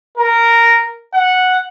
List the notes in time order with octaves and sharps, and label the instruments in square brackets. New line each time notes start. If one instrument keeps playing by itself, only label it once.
[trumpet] A#4
F#5